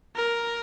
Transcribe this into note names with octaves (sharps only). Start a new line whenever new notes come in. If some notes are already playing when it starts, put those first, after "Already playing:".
A#4